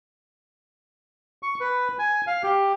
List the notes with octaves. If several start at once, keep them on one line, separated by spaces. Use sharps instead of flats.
C#6
B4
G#5
F5
G4